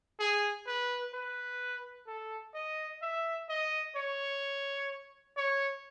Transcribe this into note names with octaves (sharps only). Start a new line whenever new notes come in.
G#4
B4
B4
A4
D#5
E5
D#5
C#5
C#5